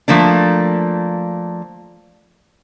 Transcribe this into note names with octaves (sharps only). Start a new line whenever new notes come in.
F3 A3 A#3 D4